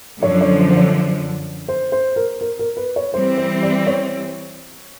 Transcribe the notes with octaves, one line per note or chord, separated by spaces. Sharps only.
F#2 D3 F3 C#5
C#5
C5
C5
C#5
C5
C5
A#4
A#4
A#4
B4
C#5
E3 G3 C4 C5
C5
D5
C#5